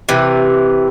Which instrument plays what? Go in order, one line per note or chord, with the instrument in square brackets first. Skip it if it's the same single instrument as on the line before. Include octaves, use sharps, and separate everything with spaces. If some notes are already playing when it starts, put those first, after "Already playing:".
[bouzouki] C3 E3